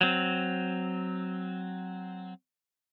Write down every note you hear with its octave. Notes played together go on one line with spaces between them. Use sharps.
F#3 C4